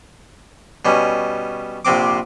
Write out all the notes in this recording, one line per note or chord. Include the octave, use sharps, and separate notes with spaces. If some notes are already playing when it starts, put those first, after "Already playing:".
B2 G3 C#4
A#1 C3 C4 D6